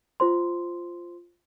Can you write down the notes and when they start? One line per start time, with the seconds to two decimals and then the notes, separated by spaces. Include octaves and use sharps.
0.20 F4 C5 C6